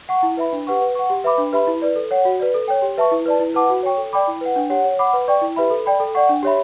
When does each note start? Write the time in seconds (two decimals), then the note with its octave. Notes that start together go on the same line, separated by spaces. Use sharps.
0.09 F#5 C#6
0.23 E4
0.37 B4 E5 B5
0.52 D4
0.67 G4 B4 F#5 C#6
0.81 B4
0.95 F#5 C#6
1.10 G4
1.24 B4 E5 B5 D6
1.38 D4
1.53 G4 B4 E5 B5
1.67 E4
1.82 B4 D5
1.96 A4
2.11 C#5 F#5
2.25 F#4
2.40 B4 D5
2.54 A4
2.68 C#5 G5
2.82 G4
2.98 B4 E5 A5 C#6
3.11 E4
3.26 B4 D5 A5
3.40 E4
3.54 B4 F#5 A5 D6
3.70 F#4
3.83 C#5 G5 C#6
3.97 A4
4.13 D5 G5 B5 D6
4.27 E4
4.41 B4 F#5
4.56 D4
4.70 G4 C#5 F#5
4.84 C#5
4.99 F#5 B5 D6
5.13 B4
5.28 D5 G5 C#6
5.41 E4
5.56 G4 B4 E5 B5
5.70 A4
5.86 D5 G5 B5
6.00 A4
6.15 D5 F#5 C#6
6.29 D4
6.43 G4 C#5 E5 B5